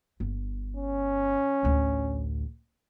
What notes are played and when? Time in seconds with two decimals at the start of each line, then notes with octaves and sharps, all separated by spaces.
0.20 G1
0.77 C#4
1.63 A1 D2